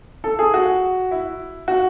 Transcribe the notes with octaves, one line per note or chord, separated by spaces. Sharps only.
A4
G#4
F#4
E4
F#4